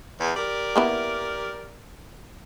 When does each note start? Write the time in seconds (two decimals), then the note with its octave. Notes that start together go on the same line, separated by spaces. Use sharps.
0.20 E2
0.35 G4 A#4 D5
0.76 A#3 B3 E4